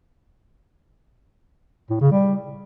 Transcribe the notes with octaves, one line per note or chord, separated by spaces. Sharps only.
A2
C#3
G3